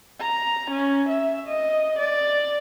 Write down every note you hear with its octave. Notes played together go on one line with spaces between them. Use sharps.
A#5
C#4
E5
D#5
D5